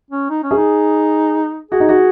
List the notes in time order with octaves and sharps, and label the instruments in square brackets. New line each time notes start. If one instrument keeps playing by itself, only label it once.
[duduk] C#4
D#4
C#4
[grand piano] G#4
[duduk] D#4
[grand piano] F#4 [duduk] G#4
[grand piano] D#4
F#4